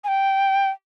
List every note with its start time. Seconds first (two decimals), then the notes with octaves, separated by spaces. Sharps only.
0.04 G#5
0.08 G5